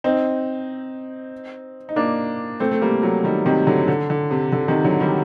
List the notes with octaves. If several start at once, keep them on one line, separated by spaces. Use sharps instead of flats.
C4 D#4
D#4
A#3 D4
A3 C4
A3
G3 A#3
F#3 A3
D#3 G3
C3 D#3
D3 F#3
D3
D3
C3
D3
C3 D#3
D3 F#3
D#3 G3